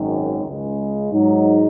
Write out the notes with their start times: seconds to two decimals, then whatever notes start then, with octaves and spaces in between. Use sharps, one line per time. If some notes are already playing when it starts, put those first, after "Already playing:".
Already playing: G#1 F#2 D#3
0.44 C#2 C#3 G#3
1.11 G#2 F#3 D#4